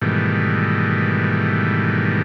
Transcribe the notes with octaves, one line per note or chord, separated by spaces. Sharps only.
G#2 B2 D#3 E3 G3 A3